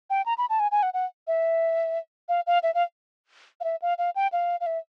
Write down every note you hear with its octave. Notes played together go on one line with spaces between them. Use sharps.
G5
A#5
B5
A5
G#5
G#5
F#5
F#5
E5
F5
F5
E5
F5
F5
E5
F5
F5
G5
F5
F5
E5